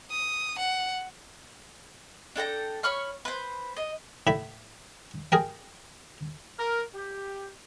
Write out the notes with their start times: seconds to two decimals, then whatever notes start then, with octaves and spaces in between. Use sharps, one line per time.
0.11 D#6
0.59 F#5
2.36 D4 A4 G5 A#5
2.83 C#5 B5 C#6 F6
3.25 B4 C5
3.76 D#5
4.27 A2 E4 B5
5.32 G#4 A#4 G5
6.59 A#4
6.94 G4